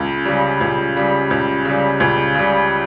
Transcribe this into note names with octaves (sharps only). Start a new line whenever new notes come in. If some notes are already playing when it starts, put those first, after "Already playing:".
Already playing: C#2
C#3 G3
C#2
C#3 G3
C#2
C#3 G3
C#2
C#3 G3